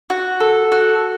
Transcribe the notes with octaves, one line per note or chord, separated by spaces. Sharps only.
F#4
A4
F#4